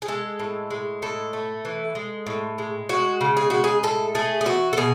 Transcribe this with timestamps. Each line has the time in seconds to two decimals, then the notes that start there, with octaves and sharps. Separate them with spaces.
0.02 G#4
0.08 G#3 A4
0.39 A2
0.71 G#3
1.02 A2 A4
1.33 A3
1.65 E3
1.95 G#3
2.26 A2
2.58 G#3
2.89 G#3 F#4
3.21 C#3
3.37 G#4
3.50 G#3 F#4
3.64 G#4
3.83 A2 A4
4.15 A3 G#4
4.41 G#4
4.46 E3 F#4
4.73 A4
4.77 B2 G#4